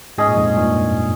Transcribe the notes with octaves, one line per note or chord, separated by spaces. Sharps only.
G#2 C#4 G#4 D#5
A#2
F2 G#2
G2 A#2